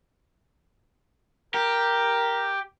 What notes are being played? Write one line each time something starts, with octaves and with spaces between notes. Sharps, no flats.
G4 A#4